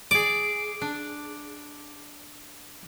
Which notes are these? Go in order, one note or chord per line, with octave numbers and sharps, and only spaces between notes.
G#4 D5 D6
D4